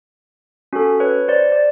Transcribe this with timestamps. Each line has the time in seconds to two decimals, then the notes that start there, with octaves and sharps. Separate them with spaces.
0.73 C#4 F#4 A4
1.00 B4 C#5
1.28 C5 D5
1.52 D5